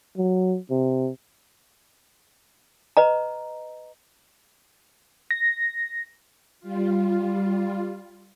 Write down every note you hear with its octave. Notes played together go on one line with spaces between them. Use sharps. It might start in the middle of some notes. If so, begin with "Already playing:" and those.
F#3
C3
B4 D#5 A#5
A#6
G3 F4